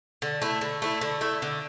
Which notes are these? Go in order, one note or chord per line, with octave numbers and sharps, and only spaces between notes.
D3
A3 E4
D3
A3 E4
D3
A3 E4
D3